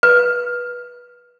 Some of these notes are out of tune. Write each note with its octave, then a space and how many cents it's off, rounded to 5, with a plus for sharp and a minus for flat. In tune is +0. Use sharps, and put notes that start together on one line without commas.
B4 -20